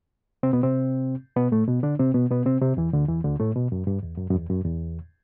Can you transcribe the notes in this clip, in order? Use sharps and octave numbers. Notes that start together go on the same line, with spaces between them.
C3 C4
B2 B3
C3 C4
B2 B3
A2 A3
B2 B3
D3 D4
C3 C4
B2 B3
B2 B3
C3 C4
C3 C4
E2 E3
D2 D3
E2 E3
D2 D3
A2 A3
B2
F#2
G2
E2
F#2
F#2
E2
F#2
E2